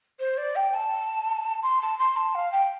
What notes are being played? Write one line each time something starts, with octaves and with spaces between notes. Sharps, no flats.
C5
D5
G5
A5
C6
A5
C6
A5
F5
G5